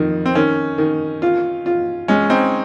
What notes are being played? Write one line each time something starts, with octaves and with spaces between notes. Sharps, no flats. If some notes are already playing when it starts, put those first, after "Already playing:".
Already playing: F2 D#3
C4
D#3 C#4
D#3
F4
F4
G#3 C#4
C4 D#4